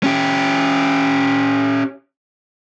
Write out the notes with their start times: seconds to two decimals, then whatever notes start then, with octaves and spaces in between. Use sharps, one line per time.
0.03 C#4 G4